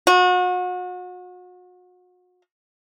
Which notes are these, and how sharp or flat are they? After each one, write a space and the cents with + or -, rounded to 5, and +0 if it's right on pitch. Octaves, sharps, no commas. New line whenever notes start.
F#4 -35